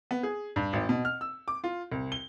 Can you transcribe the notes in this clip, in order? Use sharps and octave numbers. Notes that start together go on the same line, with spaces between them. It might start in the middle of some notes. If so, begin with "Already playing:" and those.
B3
G#4
G2
G#1
B2
F6
E6
D6
F4
C2
G7